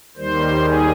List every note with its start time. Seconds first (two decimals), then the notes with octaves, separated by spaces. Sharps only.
0.17 D#2 D#3 G3 C5
0.63 G#4